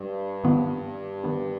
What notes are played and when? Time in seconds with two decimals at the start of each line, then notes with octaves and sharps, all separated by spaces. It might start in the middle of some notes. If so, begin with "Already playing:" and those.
Already playing: G2
0.44 G#2 D#3 B3 F4
1.24 D#3 B3 D4